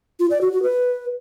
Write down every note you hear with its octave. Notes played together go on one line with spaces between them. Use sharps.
F4
D5
F#4
F#4
B4